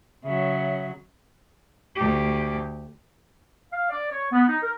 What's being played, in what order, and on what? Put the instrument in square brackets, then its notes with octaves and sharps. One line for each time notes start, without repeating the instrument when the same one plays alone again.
[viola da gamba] C#3 F#3 [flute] E5
[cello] D2 G4
[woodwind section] F5
D5
C#5
B3
D#4
A#4